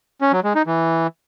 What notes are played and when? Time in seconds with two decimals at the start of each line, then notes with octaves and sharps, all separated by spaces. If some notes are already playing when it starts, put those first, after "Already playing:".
0.21 C#4
0.33 F#3
0.44 G#3
0.55 D#4
0.67 E3